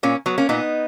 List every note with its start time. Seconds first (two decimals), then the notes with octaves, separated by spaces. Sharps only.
0.03 A#2 A#3 C#4
0.26 F#3 B3
0.38 A#3 C#4
0.49 A#2 B3 D#4